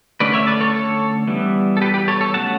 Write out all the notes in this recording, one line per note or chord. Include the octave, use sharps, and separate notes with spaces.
D3 A3 C#4 B4 D5
C#5 E5
B4 D5
A4 C#5
A4 C#5
E3 G3 B3
A4
G4 B4
G4 B4
A4 C#5
A4 C#5
F#3 A3 C#4 F#5 A5